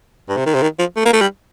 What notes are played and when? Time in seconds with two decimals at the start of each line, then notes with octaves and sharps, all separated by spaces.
0.29 G2
0.37 C3
0.46 D#3
0.54 C3
0.62 D#3
0.79 F3
0.96 A3
1.05 A#3
1.13 A3
1.21 G3